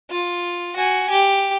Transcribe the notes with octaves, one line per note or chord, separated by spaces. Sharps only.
F4
F#4 G#5
G4